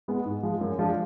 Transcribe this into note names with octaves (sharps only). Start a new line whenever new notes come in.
G#3 B3
G#2
F3 G#3
F#2
F3 G#3 D4 F4